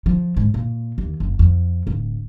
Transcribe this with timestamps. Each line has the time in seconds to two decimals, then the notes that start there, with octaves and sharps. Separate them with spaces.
0.06 F3
0.37 G#2
0.54 A#2
0.98 D#2
1.20 F#1
1.39 F2
1.87 D1